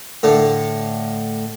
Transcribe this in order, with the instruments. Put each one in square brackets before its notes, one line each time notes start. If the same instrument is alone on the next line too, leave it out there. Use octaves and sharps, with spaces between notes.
[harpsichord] A2 D3